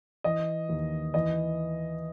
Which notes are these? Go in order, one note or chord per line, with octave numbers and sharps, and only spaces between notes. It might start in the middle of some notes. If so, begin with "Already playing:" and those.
E3 D#5
D#2
E3 D#5